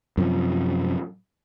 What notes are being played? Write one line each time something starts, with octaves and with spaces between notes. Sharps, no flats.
F#2 C3 F3